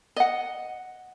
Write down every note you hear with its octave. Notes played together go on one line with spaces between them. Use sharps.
D#5 F#5